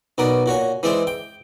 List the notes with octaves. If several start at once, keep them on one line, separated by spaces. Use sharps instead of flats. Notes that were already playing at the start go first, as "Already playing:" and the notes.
B1 B3 A#4 D5 D#6
A#2 F#4 C#5 G#5
E3 G#3 C4 D5 E5
G5